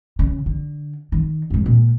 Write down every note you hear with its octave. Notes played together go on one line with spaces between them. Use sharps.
C#3
D3
D#3
E2 G#2
A#2